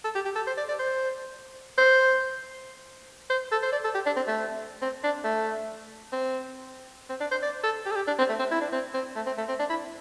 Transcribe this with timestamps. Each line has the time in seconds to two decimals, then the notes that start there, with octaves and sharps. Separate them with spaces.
0.04 A4
0.15 G4
0.25 G4
0.35 A4
0.47 C5
0.57 D5
0.68 D5
0.79 C5
1.78 C5
3.30 C5
3.52 A4
3.62 C5
3.72 D5
3.84 A4
3.94 G4
4.06 D4
4.16 C4
4.27 A3
4.82 C4
5.04 D4
5.24 A3
6.12 C4
7.09 C4
7.20 D4
7.31 C5
7.42 D5
7.64 A4
7.85 G4
7.91 A4
7.96 G4
8.07 D4
8.19 C4
8.29 A3
8.39 C4
8.51 E4
8.61 D4
8.72 C4
8.94 C4
9.16 A3
9.26 C4
9.38 A3
9.48 C4
9.59 D4
9.69 E4